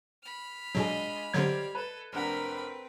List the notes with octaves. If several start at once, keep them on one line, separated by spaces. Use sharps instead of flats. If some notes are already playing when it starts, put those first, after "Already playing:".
B5 F6
B2 F#3 G#3 D4 F4 G#4 D#5
D3 F#3 G3 C5 D5 G#6
A4 B4
F1 C4 D4 A#4 B4 F#5 B5